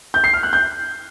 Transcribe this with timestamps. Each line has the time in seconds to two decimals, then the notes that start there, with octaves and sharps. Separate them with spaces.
0.14 G6
0.24 C7
0.34 F6
0.43 F#6
0.53 G6